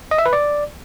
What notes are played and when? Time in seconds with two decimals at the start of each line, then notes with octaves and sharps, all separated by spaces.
0.11 D#5
0.18 E5
0.26 B4
0.33 D5